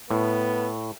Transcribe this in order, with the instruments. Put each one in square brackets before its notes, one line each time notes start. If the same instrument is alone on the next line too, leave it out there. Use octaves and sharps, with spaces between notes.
[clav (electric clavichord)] A2 [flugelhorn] B3